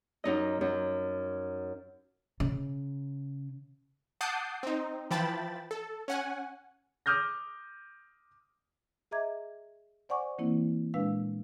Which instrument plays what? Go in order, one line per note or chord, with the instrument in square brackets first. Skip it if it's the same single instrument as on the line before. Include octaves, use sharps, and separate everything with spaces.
[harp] F#2 D#4 D#5
F#2
[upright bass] C#3
[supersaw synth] F#5 A5 D6 D#6 G6 C7
C4 D#4
E3 F3 G5 A5 B5 A6
A4
C#4 F#5 G#5
[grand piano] D6 D#6 F6 G6 A#6
[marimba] G#4 D#5 E5 A#5 D6 G#6
C5 D5 F#5 G#5 C#6 D6
E3 A#3 C4 E4
A#2 G#3 D4 B4 F5 E6